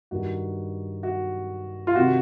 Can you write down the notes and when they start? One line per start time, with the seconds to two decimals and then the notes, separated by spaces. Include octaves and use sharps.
0.11 G2 D#3 F#4
1.03 F#4
1.87 F4
1.95 C3 D#3 F#4